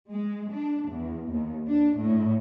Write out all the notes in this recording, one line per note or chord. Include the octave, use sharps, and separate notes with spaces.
G#3
D4
E2
D#2
D4
A2